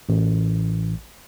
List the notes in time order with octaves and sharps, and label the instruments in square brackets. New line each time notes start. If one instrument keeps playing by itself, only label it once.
[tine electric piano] A1